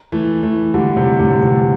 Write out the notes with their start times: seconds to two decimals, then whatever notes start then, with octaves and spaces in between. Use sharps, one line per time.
0.12 E3 A3
0.43 E3 A3
0.74 D3 G3
0.97 C3
1.20 A2 D3
1.42 C3 E3